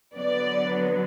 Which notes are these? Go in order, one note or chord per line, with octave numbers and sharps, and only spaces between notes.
D3 F#3 B3 D5